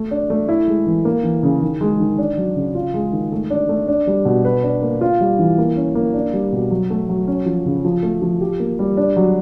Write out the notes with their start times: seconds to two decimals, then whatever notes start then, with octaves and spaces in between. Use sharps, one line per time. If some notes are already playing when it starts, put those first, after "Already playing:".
Already playing: A3
0.11 D4
0.30 A3
0.49 E4
0.68 G#3
0.86 E3
1.05 A#3
1.24 E3
1.43 C#3
1.62 D#3
1.81 G#3
2.00 D#3
2.18 D4
2.37 F#3
2.56 C#3
2.75 F4
2.94 G#3
3.13 D#3
3.32 A3
3.50 D4
3.69 A3
3.88 D4
4.07 G3
4.25 B2
4.45 B4
4.63 D4
4.82 A#3
5.01 F4
5.21 G3
5.39 E3
5.58 A#3
5.77 C#4
5.95 A#3
6.14 D4
6.33 G3
6.52 B2
6.71 F#3
6.90 A3
7.09 F#3
7.27 C#4
7.46 F3
7.66 C#3
7.85 F3
8.03 A3
8.22 F3
8.41 G4
8.60 A#3
8.79 G3
8.97 D4
9.16 F#3